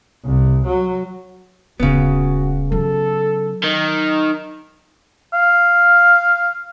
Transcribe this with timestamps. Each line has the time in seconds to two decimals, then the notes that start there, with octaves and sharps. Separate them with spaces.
0.24 C2
0.66 F#3
1.80 D#1 D2 C#3 B3 F#4
2.72 F#3 A4
3.64 D#3 D#4
5.34 F5